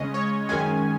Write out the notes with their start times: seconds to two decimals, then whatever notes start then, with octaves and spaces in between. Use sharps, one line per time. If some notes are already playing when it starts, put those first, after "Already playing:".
Already playing: C#3 G#3 C#4 D#5
0.14 C#5
0.49 F#2 D#3 G#3 C#4 G#5